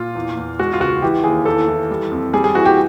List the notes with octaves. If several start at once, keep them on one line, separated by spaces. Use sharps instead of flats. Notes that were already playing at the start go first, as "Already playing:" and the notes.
Already playing: A#2 F4
E2
E2
G#3 F#4
F4
C#2 F#4
E3 G4
D#2 G#4
E2 A4
E3
G3
F2
G3 G#4
G#4
E3 F#4
G4